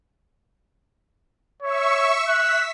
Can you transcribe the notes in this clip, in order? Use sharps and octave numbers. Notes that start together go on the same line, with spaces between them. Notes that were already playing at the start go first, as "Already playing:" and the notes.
C#5 E5 C#6 E6
E6 F#6 B6